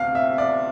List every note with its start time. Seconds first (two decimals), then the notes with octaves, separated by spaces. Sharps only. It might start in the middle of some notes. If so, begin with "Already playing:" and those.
Already playing: D2 C3 F5
0.15 E5
0.38 D5